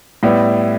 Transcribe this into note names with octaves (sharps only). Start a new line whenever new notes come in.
A2 G3 B3 E4